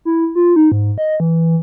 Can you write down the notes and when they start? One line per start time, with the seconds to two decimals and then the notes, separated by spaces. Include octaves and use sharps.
0.05 E4
0.35 F4
0.56 D#4
0.72 G#2
0.98 D#5
1.20 E3